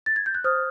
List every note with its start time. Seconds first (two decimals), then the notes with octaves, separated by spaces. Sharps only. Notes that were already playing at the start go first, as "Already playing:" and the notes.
0.06 A6
0.16 G#6
0.26 G6
0.35 F#6
0.44 C5 D#6 F6